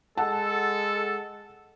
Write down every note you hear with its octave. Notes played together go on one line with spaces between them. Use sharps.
G#3 A4 F#5 A5